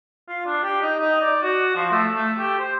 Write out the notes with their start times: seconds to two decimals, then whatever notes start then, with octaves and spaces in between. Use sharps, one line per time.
0.29 F4
0.46 D4
0.63 G4
0.82 D#4
0.99 D#4
1.21 D5
1.43 F#4
1.76 F3
1.91 A3
2.15 A3
2.39 G4
2.59 C5